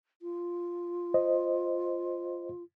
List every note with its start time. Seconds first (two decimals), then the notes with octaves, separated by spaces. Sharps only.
0.22 F4
1.14 C5 D#5